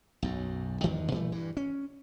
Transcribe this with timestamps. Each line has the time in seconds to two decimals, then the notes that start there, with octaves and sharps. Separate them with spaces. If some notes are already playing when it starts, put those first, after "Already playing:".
0.23 B1 F#2
0.83 E2 G2 D#3 F3
1.12 A#2 E3 G3 A3
1.32 G2 E3
1.57 C#4